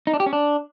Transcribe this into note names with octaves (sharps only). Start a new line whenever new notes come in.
D#4
D4
G4
C#4
D4